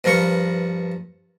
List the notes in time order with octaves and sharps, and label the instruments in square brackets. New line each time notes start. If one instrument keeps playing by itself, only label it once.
[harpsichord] G2 F3 A#4 B4 C#6